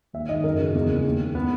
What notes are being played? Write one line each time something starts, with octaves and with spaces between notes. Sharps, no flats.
D#2 E5
D#3 D#5
F#2 A#4
C#3
E2
C#3
D#2
C#3
B3